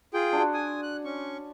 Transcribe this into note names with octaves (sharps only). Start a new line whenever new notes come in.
F4 G#4 G5
D4 F#4 C6
G#5 D#6
F#6
C#4 C#6